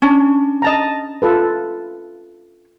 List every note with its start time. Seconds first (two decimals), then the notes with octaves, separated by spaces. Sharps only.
0.02 C#4 D4
0.62 D#5 A5 A#5
1.22 F4 A4 B4